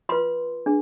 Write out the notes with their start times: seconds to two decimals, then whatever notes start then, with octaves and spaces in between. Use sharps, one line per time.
0.09 F4 B4 C6
0.66 D4 G#4